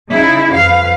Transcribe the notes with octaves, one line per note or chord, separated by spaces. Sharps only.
C#3 D#4 E4
F2 B4 F5